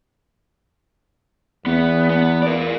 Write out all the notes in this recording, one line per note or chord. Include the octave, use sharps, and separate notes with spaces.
E2 B3
B3
A#4 D5